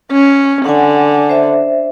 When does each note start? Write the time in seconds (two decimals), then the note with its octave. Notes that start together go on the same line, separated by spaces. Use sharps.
0.12 C#4
0.65 D3 F#5 G#5
1.29 C5 E5